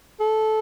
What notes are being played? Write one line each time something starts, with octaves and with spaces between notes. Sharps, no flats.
A4